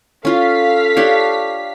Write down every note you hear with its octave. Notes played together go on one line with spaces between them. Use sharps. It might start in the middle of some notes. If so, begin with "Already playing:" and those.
C#4 F4 A4 F5 B6
D4 G4 C#5